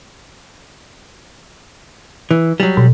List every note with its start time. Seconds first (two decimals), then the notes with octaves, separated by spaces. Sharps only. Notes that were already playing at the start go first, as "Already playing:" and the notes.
2.31 E3
2.60 F#3 G3
2.77 B2